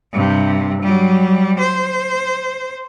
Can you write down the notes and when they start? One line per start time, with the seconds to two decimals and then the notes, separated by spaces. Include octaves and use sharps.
0.13 G2 C3
0.82 F#3 G3
1.59 C5